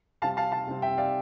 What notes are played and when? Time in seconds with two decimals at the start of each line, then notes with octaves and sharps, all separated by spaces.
0.22 C3 G3 C4 F5 A5
0.37 F5 A5
0.52 F5 A5
0.67 C3 G3 C4
0.82 E5 G5
0.98 D5 F5